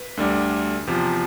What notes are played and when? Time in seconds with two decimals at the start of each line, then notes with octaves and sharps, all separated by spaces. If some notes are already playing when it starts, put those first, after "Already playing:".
Already playing: B4
0.17 D2 D3 G3 D4
0.87 E2 C3 F3